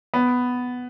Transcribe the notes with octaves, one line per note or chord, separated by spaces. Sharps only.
B3